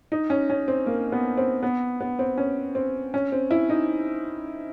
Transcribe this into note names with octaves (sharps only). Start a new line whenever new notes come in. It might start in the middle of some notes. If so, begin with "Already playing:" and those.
D#4
C#4
C#4
C4
A#3
B3
C4
B3
B3
C4
C#4
C4
C#4
C4
E4
D#4